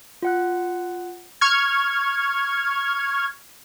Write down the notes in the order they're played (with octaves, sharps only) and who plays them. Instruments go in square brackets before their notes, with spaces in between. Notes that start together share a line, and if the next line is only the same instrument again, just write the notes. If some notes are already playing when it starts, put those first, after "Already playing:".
[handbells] F4 F#5 F#6
[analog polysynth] C#6 F6 G#6